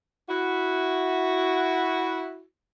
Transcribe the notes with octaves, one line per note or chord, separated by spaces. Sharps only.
E4 F#4